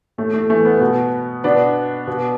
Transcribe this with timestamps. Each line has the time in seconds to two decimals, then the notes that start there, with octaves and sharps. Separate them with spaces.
0.18 A2 A3
0.34 A3
0.50 E3 A3
0.65 B3
0.81 B2
1.44 B2 B3 D4
2.07 B2